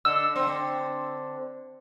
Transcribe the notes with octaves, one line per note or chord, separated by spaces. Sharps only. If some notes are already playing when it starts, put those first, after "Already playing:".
D3 D#5 E6
D3 C4